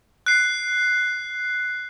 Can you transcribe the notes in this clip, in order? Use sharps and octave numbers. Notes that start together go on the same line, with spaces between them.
F#6 C7